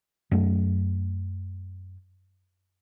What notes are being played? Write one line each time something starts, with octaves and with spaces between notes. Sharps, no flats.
F#2 A3